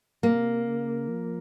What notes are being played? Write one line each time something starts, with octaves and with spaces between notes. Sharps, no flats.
C3 A#3
C#3
F3